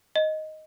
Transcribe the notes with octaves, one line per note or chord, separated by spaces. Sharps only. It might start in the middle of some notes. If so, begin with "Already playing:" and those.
D#5